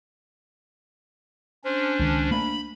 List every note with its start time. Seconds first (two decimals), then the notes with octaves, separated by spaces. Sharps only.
1.64 C#4 D4 C5
1.99 C#2 D#3
2.31 A3 A#3 D4 B5